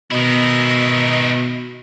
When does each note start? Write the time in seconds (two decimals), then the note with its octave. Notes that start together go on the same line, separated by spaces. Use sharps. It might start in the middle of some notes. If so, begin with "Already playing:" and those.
0.11 B2 D#3 E4 D#5